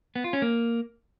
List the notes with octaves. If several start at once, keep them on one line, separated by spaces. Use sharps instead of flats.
B3
F4
C#4
A#3